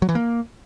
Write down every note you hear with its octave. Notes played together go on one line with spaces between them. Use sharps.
F#3
E3
A#3